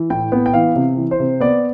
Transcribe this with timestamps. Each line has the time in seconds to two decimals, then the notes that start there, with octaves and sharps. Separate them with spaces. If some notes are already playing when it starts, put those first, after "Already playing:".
Already playing: E3
0.10 A2 G5
0.32 B3
0.46 G5
0.54 E3 F5
0.75 C3
0.97 E3
1.11 C5
1.20 C3
1.40 B3 D5